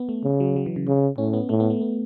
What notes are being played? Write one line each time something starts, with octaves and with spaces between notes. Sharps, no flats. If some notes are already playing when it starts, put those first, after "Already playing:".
Already playing: B3
A3
C#3
F#3
F#3
E3
C#3
C#3
A2 C#4
B3
A2 A3
B3
A3
B3